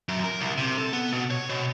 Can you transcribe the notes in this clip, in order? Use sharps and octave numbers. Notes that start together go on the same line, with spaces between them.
F#2
A#4
C2
C3
A4
B3
B2
C#5
B2